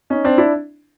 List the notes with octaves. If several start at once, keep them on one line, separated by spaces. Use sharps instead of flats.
C#4 D#4
C4 D4
D4 E4